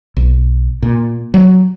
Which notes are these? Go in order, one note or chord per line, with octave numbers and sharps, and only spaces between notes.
B1
A#2
F#3